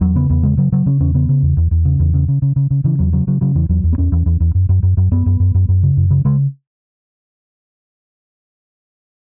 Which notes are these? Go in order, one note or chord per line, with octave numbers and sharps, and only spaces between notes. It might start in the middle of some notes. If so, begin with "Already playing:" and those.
E2 F#3
C#3 B3
E2 B3
C#3 G#3
C#3 F#3
C#3 F#3
C#3 C#4
E2 C#4
C#3 B3
C#3
E2
E2
E2
C#3
E2
C#3
C#3
C#3
C#3
C#3
C#3 E3
E2 F#3
C#3 F#3
C#3 F#3
C#3 F#3
E2 E3
E2 F#3
E2
B3
E2 C#4
E2
E2
E2
F#2
F#2
F#2
F#2
F#2 B3
F#2
F#2
F#2
F#2
C#3
F#2
C#3
C#3 G#3